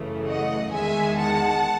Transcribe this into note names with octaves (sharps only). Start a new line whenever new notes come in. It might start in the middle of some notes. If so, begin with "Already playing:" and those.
Already playing: F#2 C#3 E3 A3
D#5 F#5
E2 D#3 G#3 E5 G#5
F#5 A5